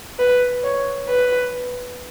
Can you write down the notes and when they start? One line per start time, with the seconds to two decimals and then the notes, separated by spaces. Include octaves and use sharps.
0.19 B4
0.64 C#5
1.09 B4